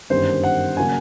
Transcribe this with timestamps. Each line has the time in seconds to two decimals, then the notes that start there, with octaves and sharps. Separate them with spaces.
0.10 G1 F#2 D#3 G3 C5
0.44 F#5
0.77 C#3 F#3 A#3 D4 G#5